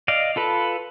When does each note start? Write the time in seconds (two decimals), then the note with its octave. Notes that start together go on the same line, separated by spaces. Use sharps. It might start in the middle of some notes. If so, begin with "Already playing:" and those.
0.08 D5 D#5 F5
0.36 F4 A4 B4